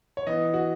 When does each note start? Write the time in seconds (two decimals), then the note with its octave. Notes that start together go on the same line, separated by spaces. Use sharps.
0.17 C#5
0.27 E3 B3 D#5
0.54 F#4